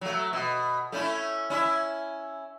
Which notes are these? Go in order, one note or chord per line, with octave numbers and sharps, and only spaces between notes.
F#3 A3
B2
A3 C#4 E4
C#4 E4 E5